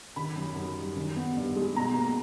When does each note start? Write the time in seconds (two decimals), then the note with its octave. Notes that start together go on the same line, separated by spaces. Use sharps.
0.16 D#3 B5
0.36 F#2
0.56 F#2
0.76 G3
0.97 D#3
1.16 B3
1.37 G2
1.56 G#3
1.76 B2 A#5
1.96 A#3